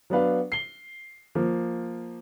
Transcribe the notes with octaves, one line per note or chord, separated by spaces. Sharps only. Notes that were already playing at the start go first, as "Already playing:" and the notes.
F#3 B3 D4 B4 F5
C7 G7
F3 A#3